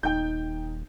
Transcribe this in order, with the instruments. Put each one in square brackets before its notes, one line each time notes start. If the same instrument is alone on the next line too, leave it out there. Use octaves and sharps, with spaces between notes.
[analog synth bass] D#1 [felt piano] D#4 [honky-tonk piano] G5 G6